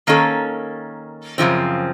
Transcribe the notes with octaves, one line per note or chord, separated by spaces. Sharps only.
D#3 A#3 C#4 A4
F#2 C#3 F3 C4